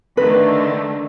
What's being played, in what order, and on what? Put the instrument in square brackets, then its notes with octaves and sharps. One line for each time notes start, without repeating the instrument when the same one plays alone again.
[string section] D3 D#3 A3 [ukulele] B4